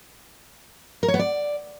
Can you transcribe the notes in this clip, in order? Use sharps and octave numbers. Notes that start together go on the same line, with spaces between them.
A#4
C#5
B3
D5